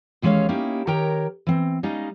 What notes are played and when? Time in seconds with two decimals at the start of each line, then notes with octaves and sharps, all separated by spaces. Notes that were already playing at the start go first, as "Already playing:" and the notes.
0.22 D#2 E3 G#3 C#4 C#5 F5
0.49 A#3 C#4 D#4 E4 G4
0.87 D#3 G4 A#4 C#5 G5 A#5
1.47 E3 C4
1.83 G3 G#3 C#4 D#4 D#5 F5